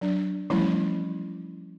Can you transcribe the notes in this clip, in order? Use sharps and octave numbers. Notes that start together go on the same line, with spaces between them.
F#3 D4
E3 F3 G3 A3 C#4 E4